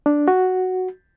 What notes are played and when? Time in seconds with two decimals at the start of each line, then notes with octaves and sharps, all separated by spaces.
0.06 D4
0.28 F#4